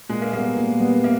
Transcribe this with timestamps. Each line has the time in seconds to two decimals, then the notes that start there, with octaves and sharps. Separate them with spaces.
0.09 A#2 G#3
0.22 A#3
0.33 G3 A#3 B3
0.57 A#2
0.80 G3 B3
1.04 A#3